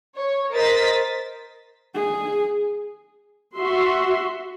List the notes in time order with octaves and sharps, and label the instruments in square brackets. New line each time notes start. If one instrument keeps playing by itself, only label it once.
[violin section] C#5
A#4 C5 D#5 A6 B6
[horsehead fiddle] G#4
[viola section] F#4 E5 C6